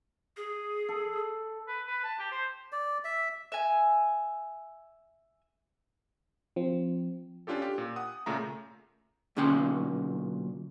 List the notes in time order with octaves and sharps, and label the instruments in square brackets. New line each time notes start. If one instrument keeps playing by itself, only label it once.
[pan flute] G#4
[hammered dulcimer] A4
[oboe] B4
B4
A5
G4
C5
[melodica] D5
E5
[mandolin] E5 G#5
[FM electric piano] F3 C4
[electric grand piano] C#4 D4 F4 G4 A4
G4
A#2
F#5 D#6
A#2 C#3 A3 E5 A#5
[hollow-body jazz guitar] B1 A#2 D3 C#4 G5 C6